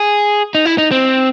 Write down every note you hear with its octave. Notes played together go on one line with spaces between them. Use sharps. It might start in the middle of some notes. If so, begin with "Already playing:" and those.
Already playing: G#4
D#4
E4
D#4
C4